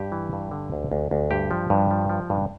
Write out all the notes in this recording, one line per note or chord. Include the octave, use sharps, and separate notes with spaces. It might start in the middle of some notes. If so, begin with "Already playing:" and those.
Already playing: G2 G4
E3
G2
D3
D2
D2
D2
G2 G4
F3
G2
F3
F3
G2